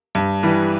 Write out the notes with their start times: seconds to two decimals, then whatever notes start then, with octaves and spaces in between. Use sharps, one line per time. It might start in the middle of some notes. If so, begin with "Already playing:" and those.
0.15 G2
0.43 E3 G3